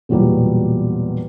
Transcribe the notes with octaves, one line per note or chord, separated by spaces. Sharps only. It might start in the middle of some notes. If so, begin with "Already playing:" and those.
B1 E2 A#2 F#3 G3